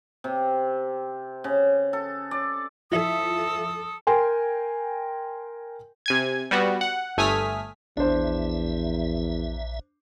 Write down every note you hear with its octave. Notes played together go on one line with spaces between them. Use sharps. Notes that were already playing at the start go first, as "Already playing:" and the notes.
C3
C#3
A4
D5
F3 E4 A4 E5 D#6
A#4 G5 G#5 C6
C3 G#5 G#6
G3 B3 F#4
F#5
G1 A3 G#5 D#6 F6 B6
A#1 E2 D4 C5 E5